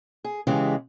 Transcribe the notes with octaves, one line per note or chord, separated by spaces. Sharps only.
G#4
C#3 E3 G#3 G4